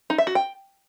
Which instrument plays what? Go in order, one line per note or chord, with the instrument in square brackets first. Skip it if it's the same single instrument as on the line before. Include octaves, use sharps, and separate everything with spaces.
[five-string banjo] D#4
E5
F#4
G5